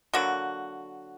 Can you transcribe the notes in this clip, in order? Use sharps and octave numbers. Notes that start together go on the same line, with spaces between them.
D3 F#3 A#3 F#4